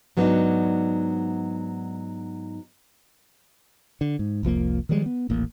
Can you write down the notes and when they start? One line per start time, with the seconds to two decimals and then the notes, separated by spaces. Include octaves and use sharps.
0.17 G#2 F#3 B3 D4 D#4
4.01 D3
4.19 G#2
4.43 F1 C2 F3 A#3
4.89 D#3 F3 G3 G#3
5.06 B3
5.29 D#1 A1 A#3